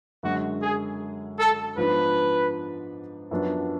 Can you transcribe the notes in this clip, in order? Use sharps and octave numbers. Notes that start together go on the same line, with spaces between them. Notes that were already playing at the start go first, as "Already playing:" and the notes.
F#2 D3 G#3 F#4
G#4
A4
G#2 F3 B3 D4 B4
F#2 F3 B3 D4